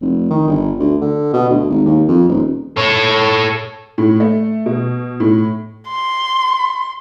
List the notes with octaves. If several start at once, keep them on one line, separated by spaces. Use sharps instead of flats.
F1
D#3
G1
D2
D3
B2
D2
G#1
D#2
F2
D#1
A4 C#5
A2
A3
B2
A2
C6